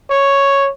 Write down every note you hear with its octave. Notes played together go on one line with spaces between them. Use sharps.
C#5